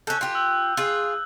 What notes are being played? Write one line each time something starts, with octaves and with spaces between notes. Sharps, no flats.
C#4 A4 F#6 G6
F4 G4
E6
F4 G#4